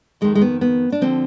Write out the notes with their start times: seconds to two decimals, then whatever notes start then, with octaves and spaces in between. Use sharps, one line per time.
0.21 F2 D#3 G#3
0.35 G#3
0.41 B3
0.61 B3
0.92 D4
1.01 D3 F3 C4